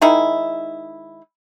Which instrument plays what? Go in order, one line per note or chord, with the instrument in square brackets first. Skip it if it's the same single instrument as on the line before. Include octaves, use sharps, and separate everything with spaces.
[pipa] D#3 G#3 D#4 E4